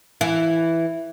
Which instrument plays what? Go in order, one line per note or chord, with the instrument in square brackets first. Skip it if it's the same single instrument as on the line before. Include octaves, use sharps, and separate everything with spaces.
[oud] E3